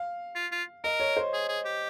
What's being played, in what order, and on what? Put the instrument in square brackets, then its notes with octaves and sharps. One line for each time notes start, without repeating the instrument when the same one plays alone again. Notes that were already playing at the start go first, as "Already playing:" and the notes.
Already playing: [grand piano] F5
[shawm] F4
F4
[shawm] A#4 [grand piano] D#5
[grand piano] C#5
C5
[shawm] G#4
G#4
G4